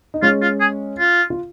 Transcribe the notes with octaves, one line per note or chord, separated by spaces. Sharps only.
D#4
G#3 C#4 F4
F4
G#4
F4
F4